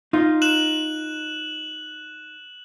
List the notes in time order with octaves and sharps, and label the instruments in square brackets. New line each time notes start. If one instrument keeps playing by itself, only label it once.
[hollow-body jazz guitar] D#4 F4
[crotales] F#6 E7 F#7